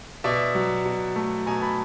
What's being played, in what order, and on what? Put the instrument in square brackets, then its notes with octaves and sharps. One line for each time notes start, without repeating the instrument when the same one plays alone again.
[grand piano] B2 D5 E5
F#3
B2
A3
B2 G#5 A#5
A5 B5